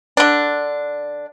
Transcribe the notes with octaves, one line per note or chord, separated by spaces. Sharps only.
D3 D4